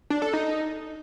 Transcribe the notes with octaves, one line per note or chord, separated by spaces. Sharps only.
D4
A4
D#4